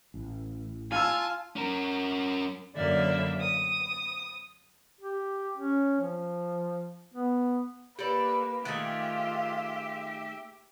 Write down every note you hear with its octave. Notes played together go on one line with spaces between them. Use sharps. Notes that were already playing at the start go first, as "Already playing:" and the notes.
A1
F4 G#5 A5 E6 F6
C#4 A#4
F#2 D3 A#3 D5 E5
D#6
G4
C#4
F3
B3
A#3 G4 A4 B4 D5
D#3 A3 F4 G4 G#4 E5 F#6